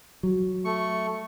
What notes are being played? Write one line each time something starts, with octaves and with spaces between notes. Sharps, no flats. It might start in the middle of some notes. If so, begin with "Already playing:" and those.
F#3
A3 C#6